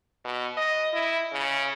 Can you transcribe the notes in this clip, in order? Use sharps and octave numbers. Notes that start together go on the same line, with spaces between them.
B2
D#5
E4
C#3